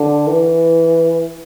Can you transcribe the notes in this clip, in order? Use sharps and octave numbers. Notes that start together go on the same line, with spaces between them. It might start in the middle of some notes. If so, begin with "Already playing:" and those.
Already playing: D3
E3